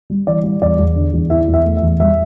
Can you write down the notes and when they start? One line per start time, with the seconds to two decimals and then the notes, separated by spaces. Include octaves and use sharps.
0.10 G3
0.27 E3 D5
0.44 G3
0.62 E2 D5
0.79 E2
0.96 D3
1.13 E2
1.30 E4 E5
1.48 E2
1.54 E5
1.65 A3
1.77 E5
1.82 E2
2.00 G3 E5